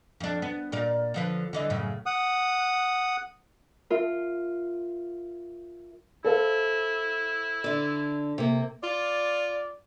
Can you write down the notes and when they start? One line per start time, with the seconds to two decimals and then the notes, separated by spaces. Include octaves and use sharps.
0.20 F2 D4
0.42 B3
0.72 A#2 A#4 D5
1.14 D3 F3 B4
1.53 D3 E3 D#5
1.70 F#2 A2 C#3
2.06 F#5 D#6
3.91 F4 A#4 E5
6.25 E4 A4 C5 F5
7.64 D3 D5
8.38 C3 A#3
8.83 F4 D5